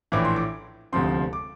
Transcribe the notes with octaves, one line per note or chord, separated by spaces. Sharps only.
A#1 A2 E3 D6
C6
D6
E1 D2 C3 F3 C4 C6
D6